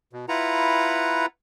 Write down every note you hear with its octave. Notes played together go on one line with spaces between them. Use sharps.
B2
E4 F4 B4 F#5 A#5